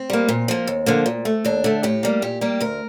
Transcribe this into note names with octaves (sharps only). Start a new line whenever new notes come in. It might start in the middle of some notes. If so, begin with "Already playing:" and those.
Already playing: C4
G3 A#3
A#2
F3 A#3
D#2
D3 F3 A#3
A#2
A3
D#2 D4
D3 A3
A2 G4
G3 A#3
A#2 G4
G3 A#3 G4
D2 A#4